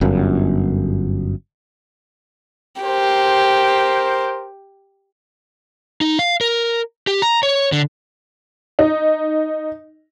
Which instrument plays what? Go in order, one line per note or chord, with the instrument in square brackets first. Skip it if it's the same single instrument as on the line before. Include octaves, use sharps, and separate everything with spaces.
[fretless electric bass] G1 F#2
[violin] G4 [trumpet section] A#4 C5
[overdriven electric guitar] D#4
F5
A#4
G4
A#5
C#5
D3
[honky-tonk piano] D#4